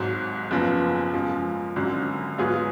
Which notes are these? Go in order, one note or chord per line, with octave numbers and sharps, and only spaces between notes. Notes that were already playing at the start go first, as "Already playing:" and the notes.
Already playing: G#1 G#2 F#3
F#1 F#2 F3 B3
F#2 F3 G#3
G#1 F#2 D3 F#3
G#2 F#3 B3 F4 G#4